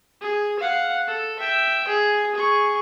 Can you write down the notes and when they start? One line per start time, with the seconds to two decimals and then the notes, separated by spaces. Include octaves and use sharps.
0.21 G#4
0.60 F5 F#5
1.08 A4
1.39 E5 G5
1.88 G#4
2.35 G#4 C#6